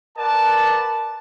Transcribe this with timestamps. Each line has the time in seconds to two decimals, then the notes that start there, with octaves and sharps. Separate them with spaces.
0.17 A#4 B4 D5 F#5 A5